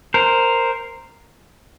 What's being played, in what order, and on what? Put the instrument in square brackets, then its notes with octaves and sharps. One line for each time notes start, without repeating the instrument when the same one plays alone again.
[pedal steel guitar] A#4 C5